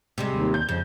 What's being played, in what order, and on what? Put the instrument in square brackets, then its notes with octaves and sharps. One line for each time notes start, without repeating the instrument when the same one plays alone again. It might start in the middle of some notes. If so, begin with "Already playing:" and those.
[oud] C3 G3 G#3
[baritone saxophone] D#2
[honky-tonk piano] G6
[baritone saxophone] F2 [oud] C#3